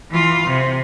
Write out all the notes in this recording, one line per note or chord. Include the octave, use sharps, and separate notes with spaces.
E3 F4
C3